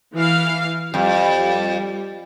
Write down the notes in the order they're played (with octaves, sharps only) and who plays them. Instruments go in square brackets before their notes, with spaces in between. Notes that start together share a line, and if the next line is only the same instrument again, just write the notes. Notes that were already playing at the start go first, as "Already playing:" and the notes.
[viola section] E3 F5
[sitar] F2 [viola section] G3